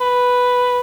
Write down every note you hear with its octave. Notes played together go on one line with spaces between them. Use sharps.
B4